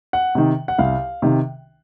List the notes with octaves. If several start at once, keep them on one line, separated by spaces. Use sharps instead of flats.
F#5
C3 D#3
F#5
C2 F5
C3 D#3